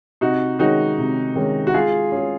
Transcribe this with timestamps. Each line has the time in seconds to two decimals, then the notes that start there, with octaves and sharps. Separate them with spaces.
0.21 C3 D#4 F#4
0.59 D#3 G#3 C#4 D#4 F#4
0.98 C3
1.35 D#3 G#3 C#4
1.67 F#4
1.74 G#3 F4 G#4
2.12 C#4 G#4